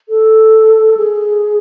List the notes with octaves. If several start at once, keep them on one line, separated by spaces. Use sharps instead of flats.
A4
G#4